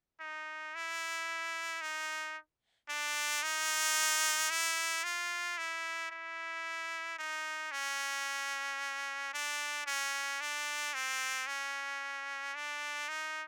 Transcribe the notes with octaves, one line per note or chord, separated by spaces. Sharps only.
D#4
E4
D#4
D4
D#4
E4
F4
E4
E4
D#4
C#4
D4
C#4
D4
C4
C#4
D4
D#4